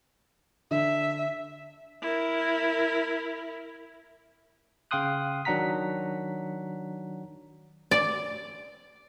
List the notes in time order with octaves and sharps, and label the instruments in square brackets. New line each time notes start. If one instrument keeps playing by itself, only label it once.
[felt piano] D3 [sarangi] E5
[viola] E4 A#4
[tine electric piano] C#3 F5 G5 C6 D#6 F#6
D#3 F#3 D4 F#5 A#5 B6
[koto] D5